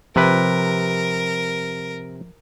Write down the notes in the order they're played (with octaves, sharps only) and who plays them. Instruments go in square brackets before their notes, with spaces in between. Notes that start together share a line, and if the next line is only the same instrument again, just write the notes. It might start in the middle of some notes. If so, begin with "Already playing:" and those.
[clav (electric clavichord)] C3 B4 [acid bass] F3 [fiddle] A#4